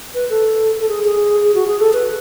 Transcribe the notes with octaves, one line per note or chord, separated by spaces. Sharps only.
B4
A4
A4
G#4
G#4
F#4
G#4
A4
B4